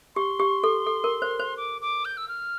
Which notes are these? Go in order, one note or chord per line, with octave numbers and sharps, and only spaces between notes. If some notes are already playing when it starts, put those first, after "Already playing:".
G4 C6
G4
A4
A4
A#4
C5
C5
D6
D6
G6
E6
F6